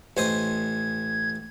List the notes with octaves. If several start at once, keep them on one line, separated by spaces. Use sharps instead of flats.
A1 C5 D#5 G#6